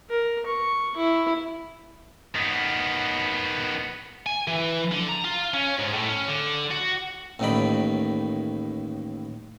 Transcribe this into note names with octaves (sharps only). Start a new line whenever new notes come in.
A#4
C#6
E4
D#3 B3
G#5
E3
D3
A#5
F4
C#4
G#2
A2
C#4
D3
F#4
A1 D#2 A2 D#3 D5 B5